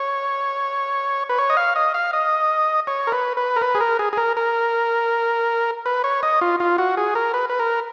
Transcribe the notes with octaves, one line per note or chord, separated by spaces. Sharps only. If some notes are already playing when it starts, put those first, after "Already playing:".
Already playing: C#5
B4
C#5
D#5
F5
D#5
F5
D#5
C#5
A#4
B4
B4
A#4
B4
G#4
A#4
G#4
G#4
A#4
A#4
B4
C#5
D#5
F4
F4
F#4
G#4
A#4
B4
B4
A#4